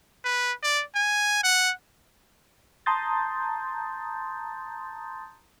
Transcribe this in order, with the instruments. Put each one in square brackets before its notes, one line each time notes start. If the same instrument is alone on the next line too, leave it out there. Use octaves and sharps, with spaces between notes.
[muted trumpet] B4
D5
G#5
F#5
[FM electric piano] A5 A#5 C6 D#6 G6 A6